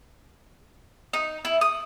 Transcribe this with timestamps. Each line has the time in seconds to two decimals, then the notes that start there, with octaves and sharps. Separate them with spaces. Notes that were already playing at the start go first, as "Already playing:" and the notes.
1.13 D#4
1.45 E4
1.61 D#6